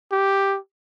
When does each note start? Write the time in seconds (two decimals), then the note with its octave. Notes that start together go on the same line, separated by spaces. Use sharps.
0.12 G4